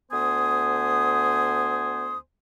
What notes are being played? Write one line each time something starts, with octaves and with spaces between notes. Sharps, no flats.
D2 B3 C5 G#5 D#6